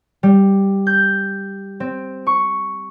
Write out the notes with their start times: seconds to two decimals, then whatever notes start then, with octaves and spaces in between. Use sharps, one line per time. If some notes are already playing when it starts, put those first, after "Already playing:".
0.23 G3
0.87 G6
1.80 C4
2.27 C#6